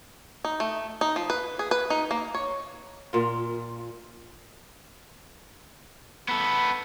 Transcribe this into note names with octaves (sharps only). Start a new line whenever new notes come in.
D#4
A3
D#4
F3
B4
G#4
B4
D#4
A#3
C#5
A#2 F4
B3 A4 B5